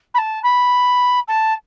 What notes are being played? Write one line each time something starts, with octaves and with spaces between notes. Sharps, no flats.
B5
A5
B5
A5